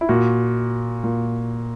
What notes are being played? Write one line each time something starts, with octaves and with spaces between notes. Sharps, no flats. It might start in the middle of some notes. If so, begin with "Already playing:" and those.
E4
A#2 F#4
A#2